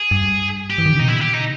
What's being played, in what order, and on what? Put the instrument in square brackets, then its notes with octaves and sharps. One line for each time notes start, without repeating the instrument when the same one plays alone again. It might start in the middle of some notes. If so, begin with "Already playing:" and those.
Already playing: [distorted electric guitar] G#4
[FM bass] G2
[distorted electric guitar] G4
[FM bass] E3
D#3
C#3
[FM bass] B2 [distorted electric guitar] D#4
[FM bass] A#2 [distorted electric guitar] E4
[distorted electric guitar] G4
D#4
[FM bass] C#3